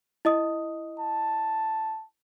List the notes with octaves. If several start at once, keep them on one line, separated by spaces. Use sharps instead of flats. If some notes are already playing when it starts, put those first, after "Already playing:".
E4 D#5 D#6
A5